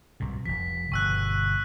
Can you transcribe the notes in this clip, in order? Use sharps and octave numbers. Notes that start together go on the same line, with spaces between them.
C2 G#2 B2
F1 F3 B6
G1 B2 C#6 E6 F#6